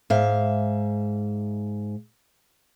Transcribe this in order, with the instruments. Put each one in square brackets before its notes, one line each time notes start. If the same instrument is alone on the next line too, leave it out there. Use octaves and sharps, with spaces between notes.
[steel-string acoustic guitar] G#2 E5 F5